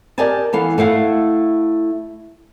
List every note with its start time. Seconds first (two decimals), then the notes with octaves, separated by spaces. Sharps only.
0.18 G4 A#4 D5 D#5 G#5 A5
0.53 E3 B3 A4 F5
0.78 A3 E4 F5 F#5